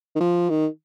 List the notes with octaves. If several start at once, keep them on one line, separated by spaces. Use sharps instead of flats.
D#3
F3
D#3